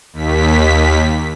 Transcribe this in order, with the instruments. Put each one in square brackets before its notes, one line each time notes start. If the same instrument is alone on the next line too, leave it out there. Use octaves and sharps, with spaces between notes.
[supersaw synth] D#2 B6